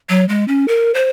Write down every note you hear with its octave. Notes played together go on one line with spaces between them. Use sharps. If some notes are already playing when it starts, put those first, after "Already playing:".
F#3
G#3
C#4
A#4
C5